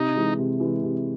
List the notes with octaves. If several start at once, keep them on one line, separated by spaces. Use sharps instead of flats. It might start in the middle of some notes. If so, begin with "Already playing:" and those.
Already playing: C3 D#4
E3 G#3
C3
E3 G#3
C3